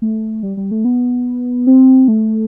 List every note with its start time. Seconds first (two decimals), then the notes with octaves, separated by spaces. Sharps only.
0.02 A3
0.43 G3
0.57 G3
0.71 A3
0.85 B3
1.67 C4
2.08 A3